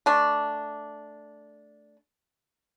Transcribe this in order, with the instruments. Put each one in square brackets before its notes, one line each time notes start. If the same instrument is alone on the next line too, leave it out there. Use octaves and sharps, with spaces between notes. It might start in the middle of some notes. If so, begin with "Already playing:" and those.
[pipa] A3 D4